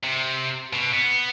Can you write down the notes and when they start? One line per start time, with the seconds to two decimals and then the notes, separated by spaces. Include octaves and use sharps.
0.04 C3
0.73 B2
0.93 B3